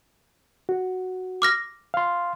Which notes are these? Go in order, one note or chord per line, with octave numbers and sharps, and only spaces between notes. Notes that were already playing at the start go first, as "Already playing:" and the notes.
F#4
D6 F6 A#6
F5 C6